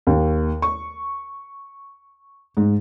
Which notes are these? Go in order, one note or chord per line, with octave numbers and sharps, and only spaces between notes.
D#2
C#6
G#2